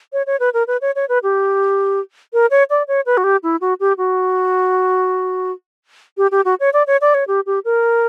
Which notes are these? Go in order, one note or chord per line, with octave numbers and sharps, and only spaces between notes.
C#5
C#5
B4
A#4
B4
C#5
C#5
B4
G4
A#4
C#5
D5
C#5
B4
F#4
G4
E4
F#4
G4
F#4
G4
G4
F#4
C#5
D5
C#5
D5
C#5
G4
G4
A#4